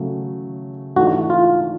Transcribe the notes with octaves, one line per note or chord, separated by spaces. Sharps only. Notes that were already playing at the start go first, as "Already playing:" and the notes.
Already playing: C#3 F#3 A3
G#2 E3 A3 D4 F#4
F4